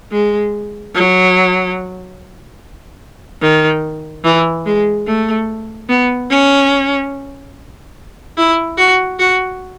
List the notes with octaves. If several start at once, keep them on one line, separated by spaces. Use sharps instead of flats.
G#3
F#3
D#3
E3
G#3
A3
B3
C#4
E4
F#4
F#4